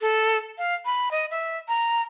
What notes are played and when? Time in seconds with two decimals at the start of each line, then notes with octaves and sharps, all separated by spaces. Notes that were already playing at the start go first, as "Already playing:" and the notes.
0.01 A4
0.58 F5
0.86 B5
1.11 D#5
1.31 E5
1.68 A#5